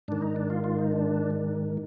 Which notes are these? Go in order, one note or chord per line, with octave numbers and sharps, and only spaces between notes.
G#2 D#3 D4
D#4
D4
F4
F4
D#4
D4